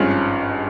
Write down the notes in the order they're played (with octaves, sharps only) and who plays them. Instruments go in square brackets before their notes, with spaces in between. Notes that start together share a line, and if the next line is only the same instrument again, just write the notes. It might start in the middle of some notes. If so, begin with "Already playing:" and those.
Already playing: [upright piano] G#1 G2 F3 G#3 C#4